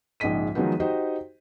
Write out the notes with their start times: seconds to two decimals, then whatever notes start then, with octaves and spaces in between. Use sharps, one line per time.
0.20 A#1 G#2 C#3 D#5 B6 D#7
0.55 D#3 F3 F#3 G#3 B3 D#4
0.80 D#4 F#4 G4 C5 D#5 G5